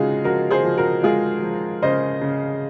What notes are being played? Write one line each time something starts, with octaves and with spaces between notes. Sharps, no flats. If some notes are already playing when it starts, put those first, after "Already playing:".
Already playing: C#3 G#3 D#4 F4 F#4 G#4
F3 F#4 A#4
G#4 C5
F3
F#4 A#4
G#3 F4 G#4
F3
C#3 C5 D#5
C#3